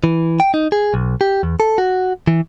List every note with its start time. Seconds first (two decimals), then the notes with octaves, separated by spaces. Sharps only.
0.04 E3
0.40 G5
0.54 D#4
0.72 G#4
0.94 B1
1.21 G4
1.43 E2
1.60 A4
1.78 F#4
2.27 E3